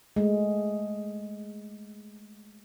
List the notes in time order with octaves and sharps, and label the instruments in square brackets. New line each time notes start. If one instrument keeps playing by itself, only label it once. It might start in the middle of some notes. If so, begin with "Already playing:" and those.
[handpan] G#3 A3